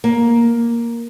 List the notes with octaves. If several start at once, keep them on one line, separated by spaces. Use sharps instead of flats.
A#3